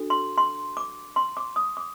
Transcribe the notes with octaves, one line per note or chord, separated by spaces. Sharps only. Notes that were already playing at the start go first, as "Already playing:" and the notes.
Already playing: D4 F#4 A4
C6
C6
D6
C6
D6
D#6
D6